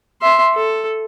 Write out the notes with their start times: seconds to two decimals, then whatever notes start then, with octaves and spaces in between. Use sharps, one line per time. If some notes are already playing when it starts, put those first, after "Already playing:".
0.21 E5 C6
0.54 A4